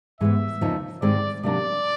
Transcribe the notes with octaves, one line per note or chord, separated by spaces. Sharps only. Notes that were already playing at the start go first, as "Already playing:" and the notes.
G#2 E3 G#3 B3 E5
E2 C#3 F3 A#3 D#4
G#2 D#3 G#3 C4 D5
C3 D#3 F#3 A#3 D4 D5